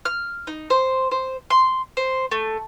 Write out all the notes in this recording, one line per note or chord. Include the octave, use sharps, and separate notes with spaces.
F6
D#4
C5
C5
C6
C5
A3